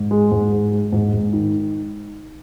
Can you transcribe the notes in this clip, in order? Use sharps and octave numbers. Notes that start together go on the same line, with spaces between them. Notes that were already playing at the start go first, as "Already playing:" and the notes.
Already playing: G#2
G#3
G#2
G#3
G#3
G#2
G#2
D#3